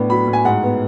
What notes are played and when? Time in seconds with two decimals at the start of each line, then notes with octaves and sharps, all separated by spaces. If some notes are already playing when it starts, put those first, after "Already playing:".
Already playing: A2 B3 D4
0.10 F#3 B5
0.27 A2
0.33 G#5
0.45 G#2 F#5
0.64 B3